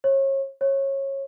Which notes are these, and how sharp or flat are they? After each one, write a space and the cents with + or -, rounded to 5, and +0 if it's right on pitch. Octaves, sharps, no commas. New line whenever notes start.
C#5 -35
C#5 -25